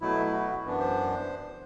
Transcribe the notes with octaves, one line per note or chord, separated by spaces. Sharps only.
B2 F#3 A3 E4
E4
F#4
F#2 E3 B3 D4
C5